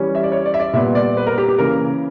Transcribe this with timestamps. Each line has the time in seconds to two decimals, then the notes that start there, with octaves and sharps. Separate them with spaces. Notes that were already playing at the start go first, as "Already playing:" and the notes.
Already playing: E3 G3 C#4
0.15 E5
0.23 D5
0.32 C#5
0.45 D5
0.54 E5
0.60 D5
0.73 A#2 G3 B3 E5
0.95 D5
1.17 B4
1.27 A#4
1.38 G4
1.48 G4
1.58 C#3 E3 A#3 A#4